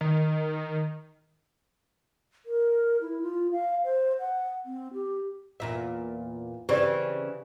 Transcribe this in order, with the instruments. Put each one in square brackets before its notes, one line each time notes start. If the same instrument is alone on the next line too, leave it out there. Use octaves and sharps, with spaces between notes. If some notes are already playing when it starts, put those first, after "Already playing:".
[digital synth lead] D#3
[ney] A#4
E4
F4
F5
C5
F#5
C4
G4
[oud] E2 A#2 E5
[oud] C#3 E3 C4 [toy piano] G4 D5